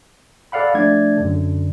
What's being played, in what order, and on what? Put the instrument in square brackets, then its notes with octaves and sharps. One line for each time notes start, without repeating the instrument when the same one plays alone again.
[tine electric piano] A4 D5 F5 F#5 B5
F3 A3 D4 D5 G#6
F#2 D3